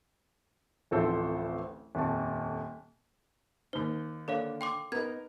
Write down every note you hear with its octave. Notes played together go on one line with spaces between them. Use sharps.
D1 A1 F3 C4 A4 C5
D#1 F2 A5
D#2 D#4 C5
D3 A#3 D4 A4 C#5 F5
G5 C6 D6
B3 D#4 A#4 B4 G#6